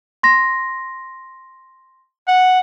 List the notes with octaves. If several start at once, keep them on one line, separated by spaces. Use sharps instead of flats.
C6 A#6
F#5